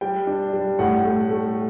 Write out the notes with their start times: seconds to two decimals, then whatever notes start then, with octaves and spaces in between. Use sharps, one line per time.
0.01 G3 G5
0.27 D4
0.53 G3
0.79 A2 F#5
1.05 A3
1.31 A3